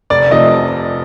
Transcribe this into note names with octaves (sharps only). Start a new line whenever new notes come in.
F1 D5
C3 F3 A3 D#5